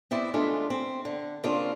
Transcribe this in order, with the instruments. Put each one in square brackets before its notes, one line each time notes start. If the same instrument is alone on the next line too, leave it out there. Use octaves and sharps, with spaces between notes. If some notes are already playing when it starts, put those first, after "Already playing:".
[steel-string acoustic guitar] B3 C4 E4 C5 D5
C#3 E3 G#3 A3 D4 F4
C4
D3
C#3 A#3 C4 D4 F4